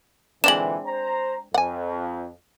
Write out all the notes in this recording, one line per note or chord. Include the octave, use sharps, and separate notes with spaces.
A#2 D3 E3 G#3 C4 D4 E7 F#7
C5 A#5
F2 F#5 G#5